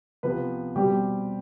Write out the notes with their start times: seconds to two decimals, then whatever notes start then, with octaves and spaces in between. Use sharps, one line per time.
0.23 C3 F3 B3 B4
0.75 B2 G3 C4 G4